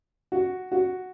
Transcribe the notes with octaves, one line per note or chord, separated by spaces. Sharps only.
F#4
F#4